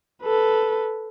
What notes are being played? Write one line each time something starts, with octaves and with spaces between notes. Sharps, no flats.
A4 B4